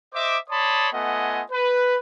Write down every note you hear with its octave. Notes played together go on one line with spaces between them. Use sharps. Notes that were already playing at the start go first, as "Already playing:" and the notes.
C5 D#5 E5 D6
C#5 D5 A5 B5 C6 D#6
A3 B3 F4 D#5 F#5 G#5
B4